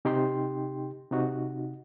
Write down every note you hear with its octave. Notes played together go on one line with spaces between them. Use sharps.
C3 D#4 G4 G5 C6
C3 D#4 F#4